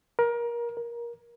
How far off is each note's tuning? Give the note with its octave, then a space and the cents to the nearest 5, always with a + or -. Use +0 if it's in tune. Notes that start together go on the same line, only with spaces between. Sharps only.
A#4 +25
A#4 +20